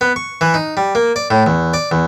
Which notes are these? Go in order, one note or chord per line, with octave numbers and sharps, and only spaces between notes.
B3
C#6
E3
D#4
G3
A#3
D5
A2
E2
D5
E2